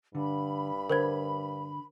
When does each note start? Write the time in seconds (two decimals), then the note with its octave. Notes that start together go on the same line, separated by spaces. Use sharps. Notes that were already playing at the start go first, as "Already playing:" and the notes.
0.15 G2 D3 B5
0.90 D3 A#4 C5 G#6